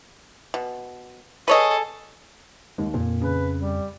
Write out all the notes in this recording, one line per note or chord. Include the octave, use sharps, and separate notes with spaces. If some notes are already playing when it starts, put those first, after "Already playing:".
B2
G#4 A4 B4 C#5 D#5
D#2 G#3
F2 A#2
C#3 B4
G3